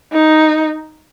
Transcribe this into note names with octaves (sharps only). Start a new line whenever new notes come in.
D#4